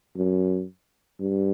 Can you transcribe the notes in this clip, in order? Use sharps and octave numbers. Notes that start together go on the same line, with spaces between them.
F#2
G2